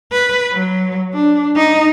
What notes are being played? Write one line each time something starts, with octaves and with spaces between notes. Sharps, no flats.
B4
F#3
D4
D#4